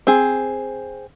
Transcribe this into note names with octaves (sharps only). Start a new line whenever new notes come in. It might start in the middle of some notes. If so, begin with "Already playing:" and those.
C4 G#4